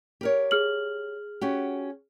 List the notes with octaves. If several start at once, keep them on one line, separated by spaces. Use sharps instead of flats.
G4 A#4 C#5
G#4 F6 F#7
C#4 F#4 G4